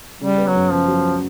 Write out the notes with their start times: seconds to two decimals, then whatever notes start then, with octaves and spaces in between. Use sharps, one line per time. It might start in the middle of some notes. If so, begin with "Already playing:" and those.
0.21 C#3 G3
0.38 B3
0.47 F#3
0.55 F#2
0.71 C#3 F3
0.88 F#3